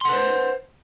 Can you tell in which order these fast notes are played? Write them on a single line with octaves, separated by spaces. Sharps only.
C6 F#5 B4 C5